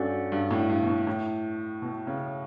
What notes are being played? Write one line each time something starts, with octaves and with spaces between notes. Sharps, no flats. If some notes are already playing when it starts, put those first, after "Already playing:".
Already playing: G2 C#4 F#4 A4 D5 F#5
G2
A2
G2
B2
A2
A2
B2
C#3